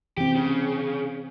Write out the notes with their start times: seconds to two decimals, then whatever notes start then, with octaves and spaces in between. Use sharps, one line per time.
0.18 E3 C4 G4
0.36 C#3